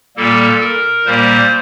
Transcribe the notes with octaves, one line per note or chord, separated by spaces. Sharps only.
A#2 G3 A#3 A4
A#4
A#2 G3 A#3 C5